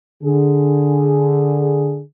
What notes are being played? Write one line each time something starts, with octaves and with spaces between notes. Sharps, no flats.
D3 G#4